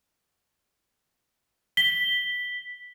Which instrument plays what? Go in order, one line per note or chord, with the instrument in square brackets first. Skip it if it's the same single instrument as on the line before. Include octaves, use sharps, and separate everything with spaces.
[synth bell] B6 [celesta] G7